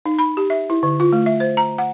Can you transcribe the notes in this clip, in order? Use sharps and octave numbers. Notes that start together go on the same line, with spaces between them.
D#4
B5
G4
E5
E4
D3
F4
A3
E5
C5
A#5
F#5